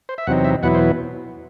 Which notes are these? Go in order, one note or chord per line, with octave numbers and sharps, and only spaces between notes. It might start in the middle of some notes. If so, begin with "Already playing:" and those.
C5
E5
E2 C3 F#3 C4 D#4 F#5
E5
E2 B2 F#3 B3 E4 F#5
C5